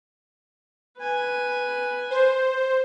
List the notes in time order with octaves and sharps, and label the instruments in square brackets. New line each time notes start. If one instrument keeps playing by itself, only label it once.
[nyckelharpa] B4 G#5
[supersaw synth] C5